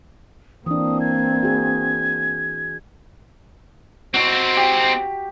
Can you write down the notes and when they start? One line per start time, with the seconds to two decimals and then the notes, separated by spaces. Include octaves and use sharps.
0.66 E3 A#3 C4 D4 D#6
1.00 G#6
1.43 F#4 G#4
4.14 C4 D#4 F#4
4.57 G4